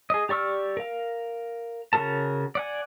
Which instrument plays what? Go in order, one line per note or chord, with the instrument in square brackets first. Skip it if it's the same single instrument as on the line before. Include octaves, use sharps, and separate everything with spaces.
[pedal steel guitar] G#4 D#5
G4 D5 C#6 E6 F6
A#4 F5
C#3 A3 F#4 A#4 A5
D5 F#5 G#5